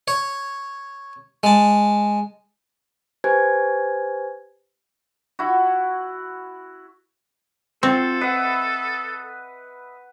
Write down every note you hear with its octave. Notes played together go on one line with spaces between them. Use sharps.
C#5
G#3 A5
G4 B4 C5 G#5 G#6
E4 F#4
C4 F4 F#4 A4 C5
B4 D#5 E5 F#5 D#6